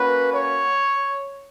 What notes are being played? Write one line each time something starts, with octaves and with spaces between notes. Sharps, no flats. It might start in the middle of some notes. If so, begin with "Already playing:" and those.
Already playing: A#3 C#4 F#4 B4
C#5